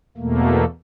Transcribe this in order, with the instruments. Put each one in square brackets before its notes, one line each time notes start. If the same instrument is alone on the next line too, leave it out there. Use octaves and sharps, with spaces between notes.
[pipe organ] E2 B2 A3 A#3